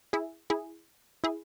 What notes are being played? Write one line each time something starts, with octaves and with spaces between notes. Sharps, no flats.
E4 G#4
E4 G#4
E4 G#4